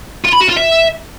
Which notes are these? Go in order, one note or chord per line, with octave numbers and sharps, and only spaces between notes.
F4
B5
F#4
F4
E5